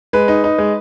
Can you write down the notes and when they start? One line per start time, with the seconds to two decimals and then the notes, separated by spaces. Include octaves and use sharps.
0.13 G#3 B4
0.28 D#4
0.44 D#4
0.58 G#3